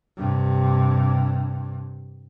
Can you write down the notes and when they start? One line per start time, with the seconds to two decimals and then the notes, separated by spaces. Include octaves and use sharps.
0.17 G2 C3